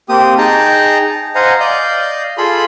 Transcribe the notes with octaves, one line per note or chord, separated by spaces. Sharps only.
A#3 C4 G4 D#6
D#4 G#4 G5 A5 A#5
C5 D#5 F5 F#5 G#5 A#5
D5 D#5 F5 G6
F4 G#4 A4 B5 C6